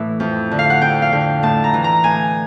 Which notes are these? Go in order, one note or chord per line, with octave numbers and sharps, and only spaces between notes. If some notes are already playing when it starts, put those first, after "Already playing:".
Already playing: A2 E3 E5
F2
D3
F5
F#5
F2 G5
F5
D3
A2 A5
A#5
E3
A#5
A2 G#5